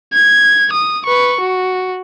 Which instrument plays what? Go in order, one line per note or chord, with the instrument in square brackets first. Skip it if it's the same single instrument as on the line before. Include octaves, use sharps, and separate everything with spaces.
[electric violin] G#6
D#6
B4 C#6
F#4